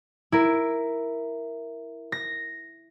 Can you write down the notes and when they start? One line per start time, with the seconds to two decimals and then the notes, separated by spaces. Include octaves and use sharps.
0.32 E4 A#4
2.12 A#6